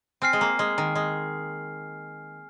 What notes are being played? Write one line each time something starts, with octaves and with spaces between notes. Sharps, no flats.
C4 G#5 F6 C7
G#3
A#3
G#3
D#3
G#3